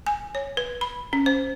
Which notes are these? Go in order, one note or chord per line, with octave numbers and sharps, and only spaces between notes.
G#5
C#5
B4
B5
C#4
C5